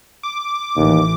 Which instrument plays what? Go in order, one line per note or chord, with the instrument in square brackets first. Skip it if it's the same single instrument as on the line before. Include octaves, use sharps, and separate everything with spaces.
[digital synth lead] D6
[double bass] A1 E3 [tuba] D#2